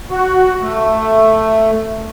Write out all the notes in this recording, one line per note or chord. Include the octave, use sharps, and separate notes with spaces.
F#4
A3